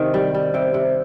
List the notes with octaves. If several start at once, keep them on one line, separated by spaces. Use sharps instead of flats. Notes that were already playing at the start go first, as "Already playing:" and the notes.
Already playing: C3 D#3 D#5
G3
G3
C3 G5
C3